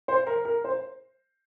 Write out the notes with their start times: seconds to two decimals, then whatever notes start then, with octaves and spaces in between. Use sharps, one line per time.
0.08 C5
0.27 A#4
0.45 A#4
0.64 C5